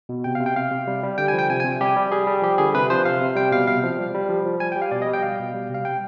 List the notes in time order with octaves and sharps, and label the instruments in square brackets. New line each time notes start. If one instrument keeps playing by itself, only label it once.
[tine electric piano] B2
C3 G5
F5
C3
G5
C3 F5
C3
G3
G3
D3 G5
G#5
F3
G5
C3 G#5
G#5
C3
G3 G4
G3
G3 G#4
G3
F3 G4
D3 G#4
C3 B4
F3 C5
C3 F5
C3
G3 G5
B2 F5
C3 F5
F3
G3
G3
F3
F3
G3 G#5
G5
G3
F5
B2 D5
D#5
G3
G5
B2 F5
B2
G3
C3
F5
G3 G5